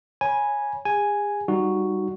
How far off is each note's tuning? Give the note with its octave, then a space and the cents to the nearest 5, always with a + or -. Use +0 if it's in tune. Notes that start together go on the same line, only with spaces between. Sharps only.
C#5 +0 G#5 +0 B5 -35
G#4 -40 G#5 +0
G3 +0 D#4 +0 F#4 +0